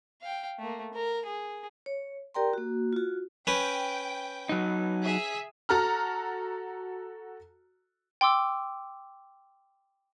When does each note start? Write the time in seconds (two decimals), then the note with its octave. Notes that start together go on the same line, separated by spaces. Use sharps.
0.22 F5 G5
0.59 A3 A#3
0.94 A#4
1.26 G#4
1.86 C#5
2.34 G4 A#4 D5 G5 A#5 C6
2.53 A#3 F#4
2.93 F4 F#4
3.47 C#4 B4 G5
4.49 F#3 D#4
5.02 G#4 E5 B6
5.69 F#4 A4 A#5 F6
8.21 G5 C6 D6 E6